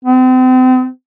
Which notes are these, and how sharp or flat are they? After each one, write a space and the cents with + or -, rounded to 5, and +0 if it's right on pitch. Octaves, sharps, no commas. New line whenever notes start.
C4 -35